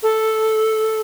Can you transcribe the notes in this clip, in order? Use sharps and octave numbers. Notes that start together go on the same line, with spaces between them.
A4